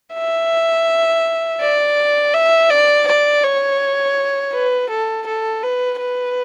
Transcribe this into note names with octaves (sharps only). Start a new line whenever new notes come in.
E5
D5
E5
D5
D5
C#5
B4
A4
A4
B4
B4